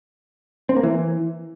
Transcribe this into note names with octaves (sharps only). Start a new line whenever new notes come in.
C4
A#3
E3